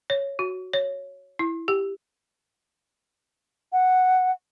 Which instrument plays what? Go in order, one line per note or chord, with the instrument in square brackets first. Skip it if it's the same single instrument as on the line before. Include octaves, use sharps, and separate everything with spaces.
[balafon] C#5
F#4
C#5
E4
G4
[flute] F#5